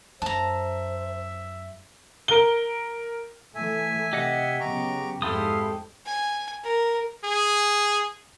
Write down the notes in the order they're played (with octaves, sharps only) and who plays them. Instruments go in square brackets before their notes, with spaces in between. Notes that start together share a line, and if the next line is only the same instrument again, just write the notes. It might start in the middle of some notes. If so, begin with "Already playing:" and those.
[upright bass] F#2 [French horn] C5 [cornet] E5 [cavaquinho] A5 A#5
[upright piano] A#4 G7
[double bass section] E3 A3 [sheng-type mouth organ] E5 G#5
[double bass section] C3 [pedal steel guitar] G4 D#5 F#5
[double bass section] C#3 F#3 B3 [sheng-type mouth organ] A#5 C#6 D6
[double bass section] F2 G#2 [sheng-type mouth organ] E4 F5 C6 [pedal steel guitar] G4 A4 D#6
[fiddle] G#5
A#4
[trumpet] G#4